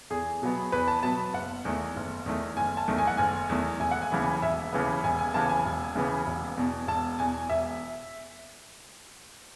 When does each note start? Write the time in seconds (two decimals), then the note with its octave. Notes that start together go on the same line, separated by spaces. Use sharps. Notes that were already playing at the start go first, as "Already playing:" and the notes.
0.10 E2 G#4
0.42 B2 F#3 B3
0.72 E2 B4
0.88 A5
1.03 B2 F#3 B3 A5
1.33 F#1 F#5
1.65 E2 D#3 A3
1.96 F#1
2.26 E2 D#3 A3
2.57 F#1 G#5
2.77 A5
2.88 E2 D#3 A3
2.98 G#5
3.07 F#5
3.17 F#1 G#5
3.49 E2 D#3 A3
3.80 E1 G#5
3.91 F#5
4.02 G#5
4.12 D#2 C#3 E3 B3
4.42 E1 E5
4.73 D#2 C#3 E3 B3
5.04 E1 G#5
5.19 G#5
5.34 D#2 C#3 E3 B3 A5
5.49 G#5
5.66 E1
5.95 D#2 C#3 E3 B3
6.27 E1
6.57 E2 B2
6.88 E1 A5
7.19 E2 B2 G#5
7.49 E1 E5